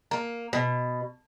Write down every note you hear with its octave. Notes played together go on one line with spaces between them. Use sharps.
A#3
B2